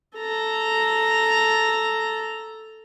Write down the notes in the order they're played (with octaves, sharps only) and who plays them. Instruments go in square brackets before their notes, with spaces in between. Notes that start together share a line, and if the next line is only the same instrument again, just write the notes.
[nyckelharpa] A4 A#5